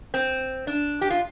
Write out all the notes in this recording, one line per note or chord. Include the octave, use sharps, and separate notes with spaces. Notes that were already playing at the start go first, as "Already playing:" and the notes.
C4
D4
G4
F4